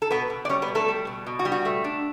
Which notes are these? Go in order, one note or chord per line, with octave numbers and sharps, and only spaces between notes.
A4
B2 B3 B4
B2
D5
G3 C#4 C#5
B3 B4
B2
A3 A4
G3
B2
B2
F#4
G3
F#4
A3
D4